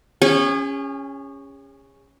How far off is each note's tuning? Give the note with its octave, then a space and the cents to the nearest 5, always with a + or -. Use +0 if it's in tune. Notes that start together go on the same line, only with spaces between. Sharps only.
C#4 +0 G#4 -40